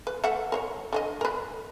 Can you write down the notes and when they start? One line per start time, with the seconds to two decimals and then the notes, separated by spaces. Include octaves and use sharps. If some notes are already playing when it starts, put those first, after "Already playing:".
0.07 B4
0.24 A3 E5 F#5
0.52 A#4 C5 C#5
0.93 D3 F4 D#5
1.21 A#4 B4